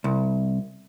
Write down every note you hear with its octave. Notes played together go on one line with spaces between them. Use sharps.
C2